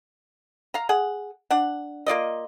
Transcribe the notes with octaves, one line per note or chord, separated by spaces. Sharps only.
F5 A#5
G#4 F#5
D4 F#5
A#3 F4 D5 D#5